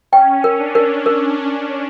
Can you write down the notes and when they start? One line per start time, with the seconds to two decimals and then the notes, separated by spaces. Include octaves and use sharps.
0.12 C#4 G5
0.44 A#4
0.59 D4
0.75 A#4
1.06 A#4